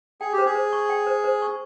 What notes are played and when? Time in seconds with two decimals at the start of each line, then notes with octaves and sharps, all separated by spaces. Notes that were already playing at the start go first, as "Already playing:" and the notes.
0.21 G#4 G5
0.33 G4
0.38 C5
0.45 G#4
0.55 C5
0.73 C#6
0.90 G5
1.07 C5
1.24 C5
1.42 C#6